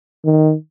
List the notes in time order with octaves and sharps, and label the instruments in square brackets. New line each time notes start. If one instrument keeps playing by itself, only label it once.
[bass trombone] D#3